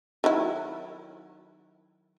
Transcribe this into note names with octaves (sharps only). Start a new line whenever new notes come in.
D#3 F#3 E4